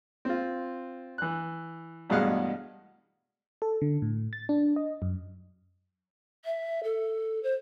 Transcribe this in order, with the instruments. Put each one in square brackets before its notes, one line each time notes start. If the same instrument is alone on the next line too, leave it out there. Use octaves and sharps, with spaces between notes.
[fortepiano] C4 F4
E3 F#6
A1 G2 B2 G#3 F5 F#5
[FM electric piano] A4
D3
A2
A6
D4
D#5
F#2
[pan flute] E5
A4
C5